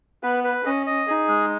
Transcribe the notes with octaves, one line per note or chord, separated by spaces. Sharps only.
B3 B4
B4
C#4 D#5
D#5
D#4 G#4
G#3